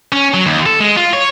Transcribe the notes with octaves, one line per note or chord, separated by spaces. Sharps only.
C#4
F#3
D#2
A4
G#3
F4
C#5